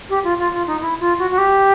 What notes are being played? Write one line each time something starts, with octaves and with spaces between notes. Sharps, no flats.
G4
F4
F4
F4
D#4
E4
F4
F#4
F#4
G4